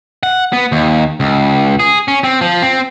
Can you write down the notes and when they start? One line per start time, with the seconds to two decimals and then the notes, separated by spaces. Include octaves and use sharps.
0.23 F#5
0.53 B3
0.72 D#2
1.20 C#2
1.80 G#4
2.08 C#4
2.24 C4
2.41 F3
2.62 C4